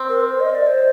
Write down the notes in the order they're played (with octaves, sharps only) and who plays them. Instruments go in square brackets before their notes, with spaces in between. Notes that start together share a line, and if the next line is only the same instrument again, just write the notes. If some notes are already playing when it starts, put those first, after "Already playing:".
Already playing: [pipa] C4
[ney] A#4
C5
D#5
D5
C5